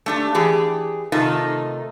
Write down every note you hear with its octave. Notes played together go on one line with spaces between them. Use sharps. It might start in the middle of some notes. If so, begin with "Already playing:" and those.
A3 D4 G4
E3 G4 G#4
C3 D#3 A3 D#4 F4